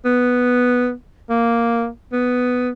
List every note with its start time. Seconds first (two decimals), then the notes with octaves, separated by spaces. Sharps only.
0.05 B3
1.30 A#3
2.12 B3